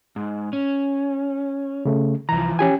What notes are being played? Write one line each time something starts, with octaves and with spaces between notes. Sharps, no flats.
G#2
C#4
C#3 A3
C2 E3 F3 A#5
C#4 G4 G#5